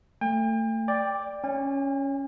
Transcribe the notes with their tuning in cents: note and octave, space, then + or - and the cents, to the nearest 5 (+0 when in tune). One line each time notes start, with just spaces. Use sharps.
A3 +25 G5 +40
D5 +0 G5 +15
C#4 +0 G#5 -45